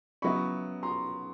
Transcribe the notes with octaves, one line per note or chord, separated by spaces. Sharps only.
C#3 F#3 B3 E4 B5 C#6
A#5 C6